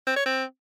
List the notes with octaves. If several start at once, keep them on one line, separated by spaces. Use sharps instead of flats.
C4
C#5
C4